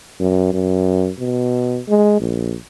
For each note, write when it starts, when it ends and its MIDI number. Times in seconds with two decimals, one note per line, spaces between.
0.20 0.53 42
0.53 1.10 42
1.19 1.79 47
1.89 2.20 56
2.20 2.55 34